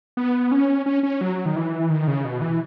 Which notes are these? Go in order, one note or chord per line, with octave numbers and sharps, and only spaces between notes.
B3
C#4
C#4
C#4
F#3
D#3
E3
D#3
C#3
B2
E3